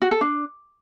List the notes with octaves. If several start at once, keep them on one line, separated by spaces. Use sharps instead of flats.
F#4
A4
D4